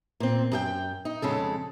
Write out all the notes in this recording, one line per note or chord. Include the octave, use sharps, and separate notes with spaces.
A#2 C4
F#2 A4 G5
D#4
F2 C#3 G#3 A4